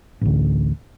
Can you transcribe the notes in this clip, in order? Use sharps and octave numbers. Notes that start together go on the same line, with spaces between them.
A1 D2